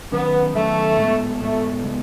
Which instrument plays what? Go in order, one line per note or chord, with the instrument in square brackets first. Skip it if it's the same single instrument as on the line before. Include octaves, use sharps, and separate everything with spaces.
[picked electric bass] D#3 F#3 C#4 [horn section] B3
[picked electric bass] D#3 F#3 C#4 [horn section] A3
[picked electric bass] A2 G#3 B3
[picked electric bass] A2 G#3 B3 [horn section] A3
[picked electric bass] C#3 G#3 B3